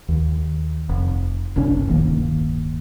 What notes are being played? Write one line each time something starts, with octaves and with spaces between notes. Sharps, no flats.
D#2
F1
F#1 C2 C#4 D4
D1 G1 D#3 A#3